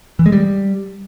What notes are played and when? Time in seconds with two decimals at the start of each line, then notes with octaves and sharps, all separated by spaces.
0.19 E3
0.26 G#3
0.32 G3